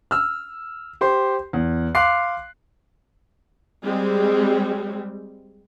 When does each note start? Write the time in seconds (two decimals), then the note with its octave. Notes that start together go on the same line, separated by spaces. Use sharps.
0.11 E6 F6
1.01 G4 C5 C6
1.53 E2
1.95 F5 C6 D6 F#6 C7
3.84 G3 G#3 C4